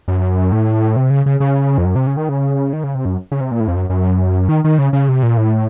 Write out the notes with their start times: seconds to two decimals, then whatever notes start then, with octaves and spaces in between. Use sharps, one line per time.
0.08 F#2
0.52 A2
0.96 C3
1.10 C#3
1.26 C#3
1.40 C#3
1.78 F2
1.85 F#2
1.96 C3
2.07 C#3
2.17 D#3
2.29 C#3
2.73 D#3
2.84 C#3
2.95 C3
3.05 F#2
3.32 C#3
3.41 C3
3.51 A#2
3.60 A2
3.68 F2
3.76 F#2
3.90 F#2
4.49 D#3
4.64 D#3
4.79 C#3
4.93 C#3
5.09 C3
5.23 A#2
5.37 A2